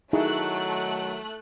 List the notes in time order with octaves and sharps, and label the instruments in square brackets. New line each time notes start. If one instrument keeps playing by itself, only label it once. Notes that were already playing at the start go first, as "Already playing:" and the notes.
[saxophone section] D#3 F#3 [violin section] A3 F#6 [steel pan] D#4 E4 G#4